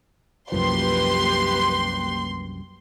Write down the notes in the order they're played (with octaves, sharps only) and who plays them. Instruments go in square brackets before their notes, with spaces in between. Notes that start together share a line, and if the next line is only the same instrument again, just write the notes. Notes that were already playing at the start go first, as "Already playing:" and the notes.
[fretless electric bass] C2 F#2 F3 [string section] A#3 G4 B4 [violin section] C6